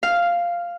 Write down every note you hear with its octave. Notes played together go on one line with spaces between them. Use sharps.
F5